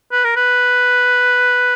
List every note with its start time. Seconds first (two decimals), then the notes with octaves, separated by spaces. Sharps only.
0.12 B4
0.25 A#4
0.36 B4